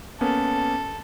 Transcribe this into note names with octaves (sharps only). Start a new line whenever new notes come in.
A#3 B3 C#4 A4